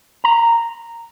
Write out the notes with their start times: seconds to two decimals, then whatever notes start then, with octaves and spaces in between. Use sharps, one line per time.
0.24 A#5